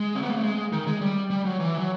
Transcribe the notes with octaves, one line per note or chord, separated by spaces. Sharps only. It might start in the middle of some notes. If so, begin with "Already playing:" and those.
Already playing: G#3
C4
B3
A#3
A3
G#3
D#3
G#3
G3
G3
F#3
E3
F#3